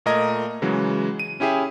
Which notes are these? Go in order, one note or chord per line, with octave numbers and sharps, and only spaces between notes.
A#2 A3 A#4 D#5 A#5 G#6
C#3 E3 F#3 G#3
D#7
C#4 E4 G4 G#4 E5